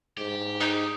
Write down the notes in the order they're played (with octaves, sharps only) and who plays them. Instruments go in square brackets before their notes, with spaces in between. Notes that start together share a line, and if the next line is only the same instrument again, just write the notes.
[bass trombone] G#2 [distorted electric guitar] G4
[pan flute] D#4 [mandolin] D#5